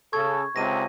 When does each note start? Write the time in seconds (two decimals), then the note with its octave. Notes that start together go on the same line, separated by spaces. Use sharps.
0.13 C#3 A4 C#6 G#6
0.56 C#2 C3 A#6 D#7